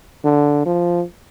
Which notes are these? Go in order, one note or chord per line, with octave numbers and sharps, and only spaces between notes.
D3
F3